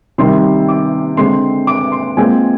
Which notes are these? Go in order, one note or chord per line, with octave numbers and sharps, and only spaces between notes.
C3 D#3 G3 C6
D6
D3 G#3 C4 C6
D6
C6
A#2 G#3 C4 G#5